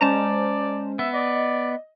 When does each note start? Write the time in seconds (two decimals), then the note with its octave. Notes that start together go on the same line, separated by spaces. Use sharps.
0.01 G#3 C#4 C5 D5 A5 A#5
0.99 B3 E5
1.14 D5 D#5